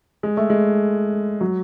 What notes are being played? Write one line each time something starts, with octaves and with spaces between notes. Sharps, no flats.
G#3
A3
G#3
F#3